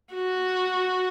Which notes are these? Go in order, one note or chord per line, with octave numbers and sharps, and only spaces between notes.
F#4